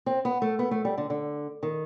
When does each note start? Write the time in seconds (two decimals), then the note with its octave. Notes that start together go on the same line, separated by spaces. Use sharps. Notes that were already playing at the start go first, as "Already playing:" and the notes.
0.06 C4
0.25 B3
0.42 A3
0.59 B3
0.71 A3
0.85 G3
0.98 D3
1.10 D3
1.63 D#3